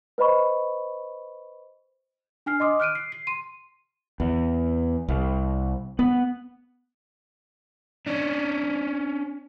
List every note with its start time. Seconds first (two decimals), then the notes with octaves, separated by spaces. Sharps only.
0.18 B4 C5 D#5 B5 C#6
2.46 D4 G#5 F6 C7
2.60 D#5 C6 D6 D#6
2.80 F6 F#6 D7 D#7
2.95 C7
3.12 C7
3.27 C6 D#7
4.20 E2
5.08 C2
5.99 B3
8.07 C#4 D4